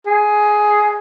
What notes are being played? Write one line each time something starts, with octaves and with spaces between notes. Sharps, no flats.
G#4